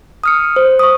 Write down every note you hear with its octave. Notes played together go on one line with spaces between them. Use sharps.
D#6 F6 C#7
C5
C#6 D#6